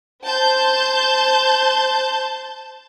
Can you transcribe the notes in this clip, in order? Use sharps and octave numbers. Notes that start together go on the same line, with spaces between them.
C5 A5 G6